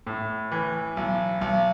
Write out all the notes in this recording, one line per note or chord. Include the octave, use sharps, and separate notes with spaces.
A2
E3
B1
B1